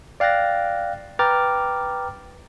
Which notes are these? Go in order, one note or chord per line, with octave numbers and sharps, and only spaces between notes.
D5 F5 G5 F#6 A6 A#6
B4 G5 A#5 D6 F6 A6